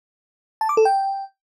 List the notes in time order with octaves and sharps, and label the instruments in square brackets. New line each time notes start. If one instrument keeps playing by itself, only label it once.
[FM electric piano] A5
D6
A4
G5